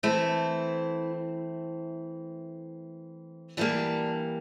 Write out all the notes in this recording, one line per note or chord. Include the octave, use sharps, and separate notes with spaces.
E3 A3 C4 E4
E3 G3 A#3 D4